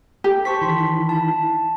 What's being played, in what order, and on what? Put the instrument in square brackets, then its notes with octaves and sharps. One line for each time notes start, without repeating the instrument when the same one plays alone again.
[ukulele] G4 [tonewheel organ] A4
[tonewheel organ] C5 [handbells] A5 C#6 B6
[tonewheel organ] D#3 E3 B5 [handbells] C6
[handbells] A5